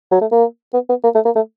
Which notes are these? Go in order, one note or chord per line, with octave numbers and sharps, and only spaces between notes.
F#3
A3
A#3
B3
B3
A#3
A3
A#3
A3